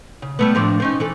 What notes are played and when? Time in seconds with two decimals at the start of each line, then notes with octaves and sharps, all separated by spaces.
0.22 C#3
0.39 G3 A3 B3
0.55 A2 F3 D4
0.80 C4 C#4 D#4
1.00 E3 A4